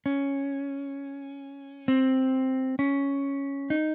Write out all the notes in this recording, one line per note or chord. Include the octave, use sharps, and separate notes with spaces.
C#4
C4
C#4
D#4